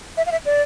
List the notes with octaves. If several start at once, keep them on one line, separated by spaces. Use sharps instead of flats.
E5
F5
E5
D5